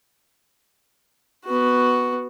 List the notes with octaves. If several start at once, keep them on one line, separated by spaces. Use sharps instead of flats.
B3 F#4